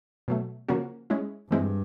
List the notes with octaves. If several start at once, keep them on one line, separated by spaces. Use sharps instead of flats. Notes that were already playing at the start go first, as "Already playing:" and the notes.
B2 F#3 A3
C#3 F3 A#3 C#4 F#4
G#3 C#4 E4
G2 E3 G#3 C4 E4